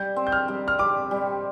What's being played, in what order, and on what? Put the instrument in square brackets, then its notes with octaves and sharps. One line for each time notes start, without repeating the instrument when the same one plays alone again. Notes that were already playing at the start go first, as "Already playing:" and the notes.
Already playing: [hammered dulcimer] G3 [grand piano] G6
[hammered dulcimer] C4
[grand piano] G6
F6
[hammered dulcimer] G3
[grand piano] F6
[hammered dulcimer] G3 [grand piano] D6
[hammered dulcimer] G3